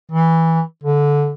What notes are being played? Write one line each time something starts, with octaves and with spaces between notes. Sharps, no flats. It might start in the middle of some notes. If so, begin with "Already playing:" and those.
E3
D3